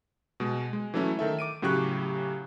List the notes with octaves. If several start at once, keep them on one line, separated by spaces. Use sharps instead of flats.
B2 G#3
G#3
E3 F#3 A3 C#4 E4
D#3 A4 E5
D6 D7 D#7
A2 C#3 F#3 G4 C#6 F#6